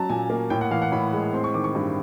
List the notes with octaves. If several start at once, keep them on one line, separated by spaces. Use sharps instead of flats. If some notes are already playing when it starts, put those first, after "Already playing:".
Already playing: F#3 C#4 A5 A#5
A#2 G#5
A#3
A2 G5
F#5
E3 F5
F#5
A2 B5
G#3
C4 C6
C#6
D#3 D6
C#6
G2